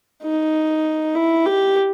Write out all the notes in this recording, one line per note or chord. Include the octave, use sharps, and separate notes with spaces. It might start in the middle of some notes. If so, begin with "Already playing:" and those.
D#4
E4
G4